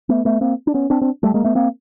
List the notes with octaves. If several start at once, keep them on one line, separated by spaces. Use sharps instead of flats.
A3 B3
A3 B3
A#3 C4
D4
B3 C#4
C4 D4
C4 D4
G3 A3
G#3 A#3
A3 B3
A#3 C4